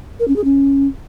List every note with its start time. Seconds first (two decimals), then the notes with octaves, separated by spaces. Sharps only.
0.20 A#4
0.28 C#4
0.36 G#4
0.44 C#4